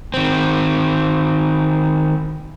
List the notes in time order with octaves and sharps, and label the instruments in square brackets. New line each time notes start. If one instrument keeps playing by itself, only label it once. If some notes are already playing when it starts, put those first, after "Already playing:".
[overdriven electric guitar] D#3 C4